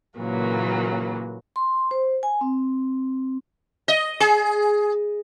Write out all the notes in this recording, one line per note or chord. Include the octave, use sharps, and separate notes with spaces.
A#2 C#3 E3 F#3 A#3
C6
C5
G#5
C4
D#5
G#4